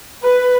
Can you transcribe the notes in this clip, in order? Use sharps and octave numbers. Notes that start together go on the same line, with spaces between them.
B4